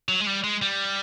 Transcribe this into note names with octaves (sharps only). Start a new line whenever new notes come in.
F#3
G#3
G3
G#3
G3